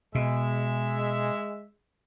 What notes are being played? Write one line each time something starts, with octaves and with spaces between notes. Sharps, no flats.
B2 G#3 E5